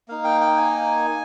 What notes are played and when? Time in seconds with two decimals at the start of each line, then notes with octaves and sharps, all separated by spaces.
0.08 A#3 D#4 F5
0.24 G5
0.41 G5
0.57 G#5